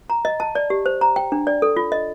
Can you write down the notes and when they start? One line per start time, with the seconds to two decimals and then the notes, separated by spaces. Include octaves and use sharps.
0.10 A#5
0.25 D#5
0.40 A5
0.55 D5
0.70 G4
0.86 C5
1.01 A#5
1.16 G5
1.32 D4
1.47 D5
1.62 A4
1.77 F4
1.92 D#5